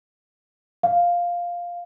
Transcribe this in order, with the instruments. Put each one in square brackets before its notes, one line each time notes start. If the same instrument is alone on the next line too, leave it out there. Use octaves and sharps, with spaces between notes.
[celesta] F5